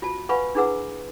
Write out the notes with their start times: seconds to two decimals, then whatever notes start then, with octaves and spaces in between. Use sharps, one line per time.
0.02 F4 F#4 A5
0.29 B4 F5 F#5 G#5 B5 C#6
0.55 D4 E4 G#4 B4 F#5 E6